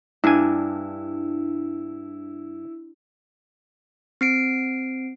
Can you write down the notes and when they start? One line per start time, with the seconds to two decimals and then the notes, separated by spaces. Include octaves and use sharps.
0.24 G2 D4 E4 G#5
4.21 C4 C7 D7